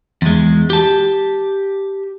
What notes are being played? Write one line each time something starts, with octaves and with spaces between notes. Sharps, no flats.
E2 G#3
G4 A5